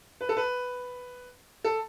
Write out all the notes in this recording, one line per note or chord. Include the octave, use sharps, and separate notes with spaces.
B4
A4
B4
A4